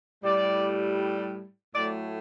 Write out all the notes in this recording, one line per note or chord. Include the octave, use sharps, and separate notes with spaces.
A2 G3 D5
A2 F#3 A3 D5